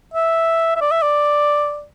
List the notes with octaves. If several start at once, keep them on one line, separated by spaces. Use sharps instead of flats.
E5
E5
D5
E5
D5